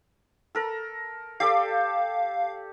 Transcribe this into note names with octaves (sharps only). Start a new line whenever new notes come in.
A4 A#4
G4 A4 D5 F5